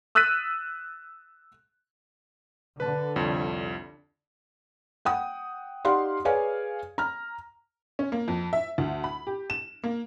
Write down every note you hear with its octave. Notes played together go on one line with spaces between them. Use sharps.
D#6 E6 F#6 A6 B6 D#7
D3 B4 A5
C2 F2 C#5
F#5 G5 D#6
D#4 G4 D5 F5 F#5 C6
G#4 B4 C#5 D5 F5 G#5
A#5 F6
C#4
A#3
F2
E5
D2
B5
G4
E7
A#3